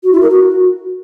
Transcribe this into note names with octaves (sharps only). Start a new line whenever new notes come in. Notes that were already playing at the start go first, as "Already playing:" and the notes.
F#4
E4
A#4
F#4